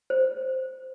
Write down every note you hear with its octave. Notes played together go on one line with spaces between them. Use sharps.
C5